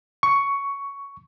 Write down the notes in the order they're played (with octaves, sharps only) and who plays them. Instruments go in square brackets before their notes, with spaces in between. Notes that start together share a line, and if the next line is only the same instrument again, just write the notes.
[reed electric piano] C#6